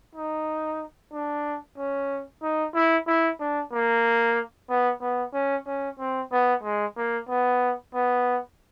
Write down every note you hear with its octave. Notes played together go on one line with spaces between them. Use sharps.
D#4
D4
C#4
D#4
E4
E4
D4
A#3
B3
B3
C#4
C#4
C4
B3
G#3
A#3
B3
B3